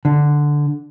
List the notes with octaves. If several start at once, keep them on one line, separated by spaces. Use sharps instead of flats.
D3